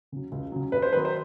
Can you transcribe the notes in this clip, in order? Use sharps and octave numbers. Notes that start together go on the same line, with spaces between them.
C#3 F#3
C#2
C#3 F#3
G2 B4
C5
D#3 F#3 B4
C5